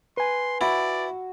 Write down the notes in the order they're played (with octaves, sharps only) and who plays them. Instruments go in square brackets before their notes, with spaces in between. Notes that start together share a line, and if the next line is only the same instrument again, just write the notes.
[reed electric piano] B4 G#5 [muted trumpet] C6
[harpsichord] E4 [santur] F#4 C#6 [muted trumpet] D5